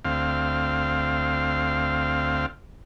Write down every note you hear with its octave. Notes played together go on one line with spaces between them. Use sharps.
D2 C4 F5